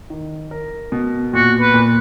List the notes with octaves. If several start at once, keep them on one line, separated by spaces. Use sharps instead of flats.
D#3
A#4
B2
A#2 F#4
B4
A#2